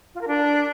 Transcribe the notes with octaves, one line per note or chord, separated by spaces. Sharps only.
F4
A#4
D4